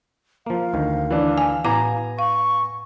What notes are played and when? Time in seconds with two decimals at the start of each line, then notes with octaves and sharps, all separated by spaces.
0.46 F3 A#3 F5
0.74 D2 D#3
1.11 E3 D4
1.38 G#5
1.64 A2 B3 E4 G#5 A#5 D6
2.19 F5 C#6